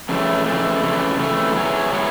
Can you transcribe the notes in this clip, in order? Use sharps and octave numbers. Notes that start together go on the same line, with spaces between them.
F2 C#3 E3 A3
F2 C#3 E3 A3
F2 C#3 E3 A3
F2 C#3 E3 A3
F#3 B3 E4 G#4 C#5
F#3 B3 E4 G#4 C#5